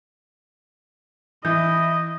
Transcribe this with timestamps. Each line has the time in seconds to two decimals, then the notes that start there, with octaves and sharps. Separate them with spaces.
1.45 E3 E4 D#5 G6